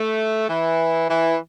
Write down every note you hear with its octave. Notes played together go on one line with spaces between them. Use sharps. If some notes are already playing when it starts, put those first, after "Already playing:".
Already playing: A3
E3
E3